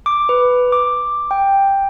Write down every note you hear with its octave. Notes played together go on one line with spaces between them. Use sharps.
D6
B4
D6
G5